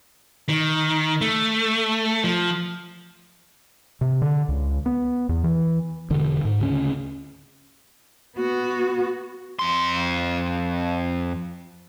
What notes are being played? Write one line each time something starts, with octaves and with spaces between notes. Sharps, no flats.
D#3
A3
F3
C3
D3
C#2
B3
E2
E3
E1 D3
G#2
D2 C#3 C#4
B3 F#4
F2 C6